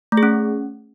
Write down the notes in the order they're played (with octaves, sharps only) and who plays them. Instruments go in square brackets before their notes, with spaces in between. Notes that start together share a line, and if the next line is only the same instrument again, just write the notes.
[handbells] A3
G#4
C#4